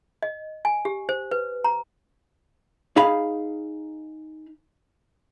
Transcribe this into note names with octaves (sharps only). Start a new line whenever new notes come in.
D#5
G#5
G4
C5
B4
A#5
D#4 G#4 F5 B5